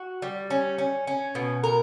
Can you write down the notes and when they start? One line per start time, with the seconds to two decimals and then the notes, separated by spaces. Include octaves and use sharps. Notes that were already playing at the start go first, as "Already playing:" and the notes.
Already playing: F#4
0.22 G3
0.50 C#4
0.78 C#4
1.07 C#4
1.35 B2
1.64 A#4